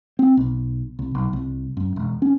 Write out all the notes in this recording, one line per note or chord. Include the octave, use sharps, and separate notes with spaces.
C4
B1
C2
B1
C2
F#2
E1
C#4